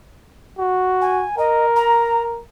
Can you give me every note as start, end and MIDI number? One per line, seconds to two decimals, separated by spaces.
0.59 1.25 66
1.01 1.36 80
1.38 2.41 70
1.38 1.66 75
1.76 2.23 82